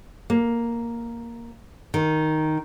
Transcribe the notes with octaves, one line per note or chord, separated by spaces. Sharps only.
A#3
D#3